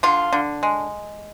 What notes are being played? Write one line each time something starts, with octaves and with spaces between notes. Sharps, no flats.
D3 F4
D3
G#3